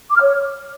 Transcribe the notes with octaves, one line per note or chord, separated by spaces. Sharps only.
D6
F6
C#5